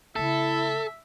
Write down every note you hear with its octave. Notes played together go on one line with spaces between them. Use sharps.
C#3 A3 E4 A4 E5